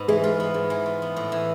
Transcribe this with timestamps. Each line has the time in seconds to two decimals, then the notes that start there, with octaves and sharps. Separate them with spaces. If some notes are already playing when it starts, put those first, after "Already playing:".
Already playing: G#2 B3
0.08 E3 G#3
0.24 F4
0.40 B3
0.54 G#2
0.70 E3
0.86 F4
1.02 B3
1.16 A2
1.32 E3